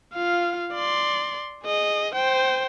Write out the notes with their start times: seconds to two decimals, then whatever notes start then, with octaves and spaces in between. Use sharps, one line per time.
0.14 F4 F5
0.74 D5 C6
1.64 G#4 D#5
2.14 C5 G5